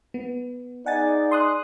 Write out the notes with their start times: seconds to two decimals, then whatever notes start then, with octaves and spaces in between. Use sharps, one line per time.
0.14 B3
0.86 D#4 G#4 D5 F#5 G#5 A6
1.31 C6 D#6 F#6